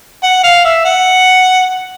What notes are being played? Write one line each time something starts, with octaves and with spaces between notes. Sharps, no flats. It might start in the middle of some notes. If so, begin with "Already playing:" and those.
F#5
F5
E5
F#5